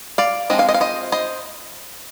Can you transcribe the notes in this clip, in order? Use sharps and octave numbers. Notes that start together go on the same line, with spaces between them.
D5 F5
F3 G#3 C4 D#5
F5
C5 D#5
F5
C5 D#5
C5 D#5